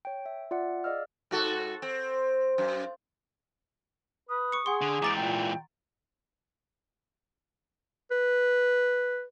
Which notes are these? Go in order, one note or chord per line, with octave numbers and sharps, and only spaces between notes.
C#5 G5
E5
F4 D5 E5 F#5
G#4 D5 D#5 F5 E6 F6
G#2 F#4 A4
C4
F#2
B4 D#6
C#6 C#7
G#4 F#5 C6
D3
G#2 E3 A#5 D6 A6 D7
A#2 G5
B4